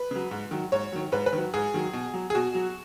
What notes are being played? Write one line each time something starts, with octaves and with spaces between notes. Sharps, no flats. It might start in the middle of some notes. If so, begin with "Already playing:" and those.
Already playing: B4
C#3 F#3
G#2
D#3 F#3
G#2 C#5
D#3 F#3
G#2 B4
B4
D#3 F#3
G#2 G#4
D#3 F#3
B2
F#3
G#4
B2 F#4
F#3